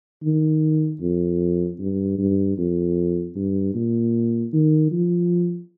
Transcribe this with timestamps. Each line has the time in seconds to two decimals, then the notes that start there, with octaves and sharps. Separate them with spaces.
0.24 D#3
1.01 F2
1.80 G2
2.18 G2
2.58 F2
3.36 G2
3.75 A#2
4.53 D#3
4.92 F3